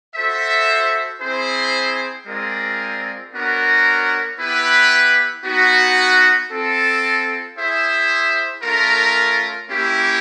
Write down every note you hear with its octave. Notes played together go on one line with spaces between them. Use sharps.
F#4 A4 C5 E5
C4 E4 G#4 C5
G#3 C4 F4 A#4 D5
B3 D4 F#4 A#4 C#5
B3 E4 G4 B4
B3 D#4 F#4
C4 F4 A4
E4 G#4 C5 E5
A3 C#4 F4 A#4
A#3 C#4 E4 G4